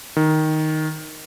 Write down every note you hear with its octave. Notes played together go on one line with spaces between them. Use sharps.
D#3